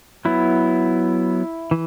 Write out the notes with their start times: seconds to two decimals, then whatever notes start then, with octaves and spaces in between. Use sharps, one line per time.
0.25 F#3 B3 E4
1.71 E3